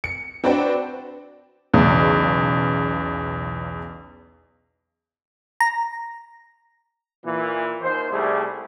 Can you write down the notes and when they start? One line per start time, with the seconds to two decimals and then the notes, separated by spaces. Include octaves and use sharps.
0.04 C#7
0.44 C4 D4 F#4 B4 D5 G5
1.73 B1 E2 C#3
5.60 A#5
7.25 A#2 E3
7.82 D#2 C5
8.11 C2 C3 G3 A3 E4 G#4